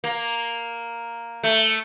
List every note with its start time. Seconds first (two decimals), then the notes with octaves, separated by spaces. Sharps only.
0.04 A#3
1.43 A3